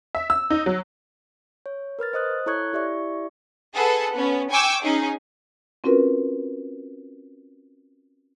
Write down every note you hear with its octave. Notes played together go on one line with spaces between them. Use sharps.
E5
E6
D#4
F#3
C#5
A#4 B4 F6 A6
C5 D#5 D#6 F#6
E4 A4 C#5 C#6 F#6 G#6
E4 G4 D5 E5 C#6
G#4 A4 B4 F#5
B3 C#4
G5 G#5 C#6 D6 E6 G6
C#4 D#4 G#4
C4 C#4 F4 F#4 A#4 B4